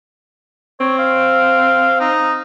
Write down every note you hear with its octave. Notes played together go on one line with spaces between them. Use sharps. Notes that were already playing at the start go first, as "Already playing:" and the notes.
C4 C#5
F5
D#4